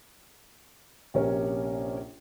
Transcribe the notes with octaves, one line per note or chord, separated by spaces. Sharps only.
A#1 C3 C#4 A#4 C#5